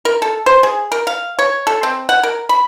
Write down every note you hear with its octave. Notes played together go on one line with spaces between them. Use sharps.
A#4
A4
C5
G#4
A#4
F5
C#5
A4
C4
F#5
A#4
B5